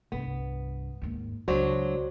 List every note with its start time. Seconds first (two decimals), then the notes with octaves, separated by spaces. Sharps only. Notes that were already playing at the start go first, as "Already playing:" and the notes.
0.12 C2 G2 B3
1.02 D#2 G#2
1.48 C#2 F#3 D4 F#4 C5 D5